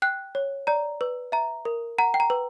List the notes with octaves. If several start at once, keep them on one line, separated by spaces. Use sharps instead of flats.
G5 F#6
C#5
D5 A#5
B4
E5 A#5
A#4
F#5 A#5
G5
A#5
B4